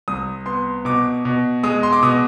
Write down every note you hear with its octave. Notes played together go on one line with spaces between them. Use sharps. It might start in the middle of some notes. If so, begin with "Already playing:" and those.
C2 D#6
B3 C6
B2 D6
B2
G#3 D#6
C6
D6
B2 D#6